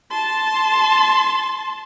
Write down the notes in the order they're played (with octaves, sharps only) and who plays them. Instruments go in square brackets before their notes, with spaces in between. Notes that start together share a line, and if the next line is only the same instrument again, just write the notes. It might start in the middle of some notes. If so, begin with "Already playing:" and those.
[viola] A5 C6